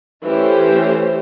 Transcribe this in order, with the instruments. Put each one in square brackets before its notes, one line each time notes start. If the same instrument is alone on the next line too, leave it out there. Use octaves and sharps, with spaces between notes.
[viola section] E3 A3 C#4 G4 C5